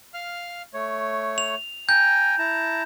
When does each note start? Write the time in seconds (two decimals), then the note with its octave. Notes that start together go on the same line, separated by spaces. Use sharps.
0.14 F5 F6
0.74 A3 C#5
1.38 F7
1.89 G5 G#5 A#5 G6
2.39 E4 A5 A#5